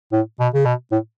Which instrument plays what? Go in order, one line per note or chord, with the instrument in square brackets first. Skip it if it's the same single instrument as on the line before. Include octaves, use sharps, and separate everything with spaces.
[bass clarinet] A2
B2
C#3
B2
A2